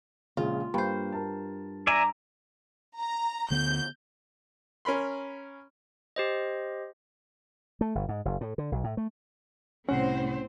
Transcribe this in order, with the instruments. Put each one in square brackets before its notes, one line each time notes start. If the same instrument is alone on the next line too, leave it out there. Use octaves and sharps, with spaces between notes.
[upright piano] A#1 C#3 G#3 [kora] F4
[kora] G2 C5 [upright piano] A#3
[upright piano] A#4 A5
[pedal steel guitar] D5 E5 G#5 [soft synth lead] A#5
[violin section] A#5
[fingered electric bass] D2 D3 B3 [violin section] G6
[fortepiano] C#4 A#4 B5 C6
[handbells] G4 C5 D#5
[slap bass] A3
G1
G#2
F#1
A2
D3
B1
A2
A3
[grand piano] C2 F#5 [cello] A2 [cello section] C4 C5 [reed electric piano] C#4